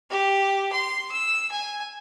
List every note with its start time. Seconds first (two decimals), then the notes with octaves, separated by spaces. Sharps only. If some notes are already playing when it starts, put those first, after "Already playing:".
0.10 G4
0.72 C6
1.11 E6
1.51 G#5